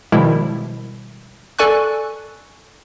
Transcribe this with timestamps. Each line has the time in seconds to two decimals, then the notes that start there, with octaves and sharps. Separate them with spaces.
0.12 B2 D#3 F3 G3 G#3 E4
1.59 A4 D5 G#5 C#6 F#6